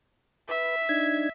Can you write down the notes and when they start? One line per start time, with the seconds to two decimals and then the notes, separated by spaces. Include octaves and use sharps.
0.49 B4 E5
0.89 D4 D#4 G#6